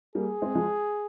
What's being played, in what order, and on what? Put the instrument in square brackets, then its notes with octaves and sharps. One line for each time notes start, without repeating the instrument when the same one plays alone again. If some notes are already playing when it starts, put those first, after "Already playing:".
[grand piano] G3 A#3 [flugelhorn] G#4
[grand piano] G#3 C4
F3 G#3